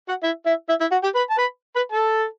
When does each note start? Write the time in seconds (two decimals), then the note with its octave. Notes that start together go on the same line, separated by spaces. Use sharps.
0.08 F#4 F#5
0.23 E4 E5
0.46 E4 E5
0.69 E4 E5
0.81 E4 E5
0.92 F#4 F#5
1.03 G4 G5
1.15 B4 B5
1.30 A5
1.37 B4 B5
1.76 B4 B5
1.92 A4 A5